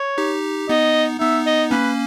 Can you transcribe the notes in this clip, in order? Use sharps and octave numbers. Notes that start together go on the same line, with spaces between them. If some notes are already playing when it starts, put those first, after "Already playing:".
Already playing: C#5
D#4 G4
B3 D#4 D#5
B3 D#4 E5
D#5
A#3 C#4 B4